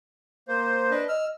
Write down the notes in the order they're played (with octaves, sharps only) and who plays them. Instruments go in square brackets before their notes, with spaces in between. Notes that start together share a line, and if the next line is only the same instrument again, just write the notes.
[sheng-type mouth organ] A#3 [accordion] C5
[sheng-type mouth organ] D4 B4 D#5
[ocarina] D#5 [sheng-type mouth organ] E6 [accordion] F6